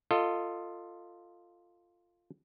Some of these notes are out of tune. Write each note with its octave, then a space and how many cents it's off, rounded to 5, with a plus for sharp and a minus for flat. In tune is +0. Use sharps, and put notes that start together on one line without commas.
F4 +0 A4 +25 D#5 +0